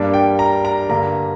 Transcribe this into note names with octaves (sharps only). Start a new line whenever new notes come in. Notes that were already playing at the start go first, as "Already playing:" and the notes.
Already playing: G2 G3 A#3 D4
G5
A#5
A#5
G2 D3 A#3 A#5